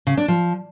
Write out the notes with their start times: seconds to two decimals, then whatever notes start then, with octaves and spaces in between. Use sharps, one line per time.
0.07 C#3
0.17 D4
0.28 F3